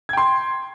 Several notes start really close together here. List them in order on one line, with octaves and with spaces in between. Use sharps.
G#6 G5 C6